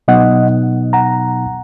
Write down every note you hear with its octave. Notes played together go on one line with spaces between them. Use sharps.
B2 F#3 B3 D#4 D#5 F#5
F#5 A#5